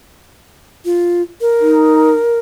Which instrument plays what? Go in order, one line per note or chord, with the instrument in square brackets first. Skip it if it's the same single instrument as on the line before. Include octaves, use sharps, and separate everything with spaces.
[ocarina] F4
A#4
[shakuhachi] D#4